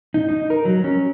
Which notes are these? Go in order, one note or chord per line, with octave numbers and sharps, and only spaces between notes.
D#4
D#4
A#4
F#3
C#4